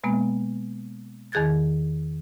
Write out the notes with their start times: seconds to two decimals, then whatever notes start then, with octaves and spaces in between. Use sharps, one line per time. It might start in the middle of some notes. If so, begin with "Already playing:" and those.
0.04 B2 G#3 A#3 B3
1.32 E2 D#3 G#4 F#6 G#6 A6